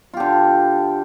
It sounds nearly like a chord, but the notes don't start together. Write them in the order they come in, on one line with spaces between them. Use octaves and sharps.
F4 G4 D3